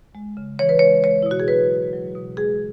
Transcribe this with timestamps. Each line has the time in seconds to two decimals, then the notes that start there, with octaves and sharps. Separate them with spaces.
0.15 G#3
0.37 C#3
0.59 E3 C#5
0.69 B4
0.79 G#3 C#5
1.04 G#3 C#5
1.22 E4
1.26 B2 F#4
1.40 G#4
1.48 F#3 B4
1.71 B2
1.93 F#3
2.15 B2
2.37 G#3 G#4